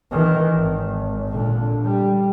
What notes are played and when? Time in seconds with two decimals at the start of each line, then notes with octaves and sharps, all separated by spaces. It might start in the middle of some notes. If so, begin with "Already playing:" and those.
0.11 D#3 E3
0.54 G#1
1.32 A#2 D3
1.83 G3